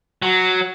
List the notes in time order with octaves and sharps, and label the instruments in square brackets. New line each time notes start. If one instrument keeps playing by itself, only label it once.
[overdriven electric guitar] F#3